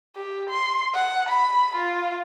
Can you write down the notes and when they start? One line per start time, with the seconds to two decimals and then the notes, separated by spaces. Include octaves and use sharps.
0.16 G4
0.50 C6
0.94 F#5
1.29 B5
1.76 F4